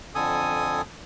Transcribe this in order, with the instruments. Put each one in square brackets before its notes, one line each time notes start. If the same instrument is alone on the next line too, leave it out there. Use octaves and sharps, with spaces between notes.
[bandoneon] F2 D3 A4 G#5 D#6